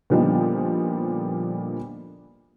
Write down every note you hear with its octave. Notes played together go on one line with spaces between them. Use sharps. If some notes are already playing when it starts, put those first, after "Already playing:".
A#2 D3 F3 G3 B3 D#4